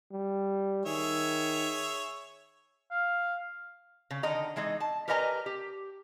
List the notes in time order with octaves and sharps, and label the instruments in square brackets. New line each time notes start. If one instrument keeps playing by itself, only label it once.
[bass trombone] G3
[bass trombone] D#3 [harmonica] G#4 C#5 E5
[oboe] F5
[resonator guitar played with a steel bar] C#3
D3 D#3 D#5 A#5
E3 G#3 D#4 D#5
A5
G4 A#4 B4 D#5 G#5 A#5
G4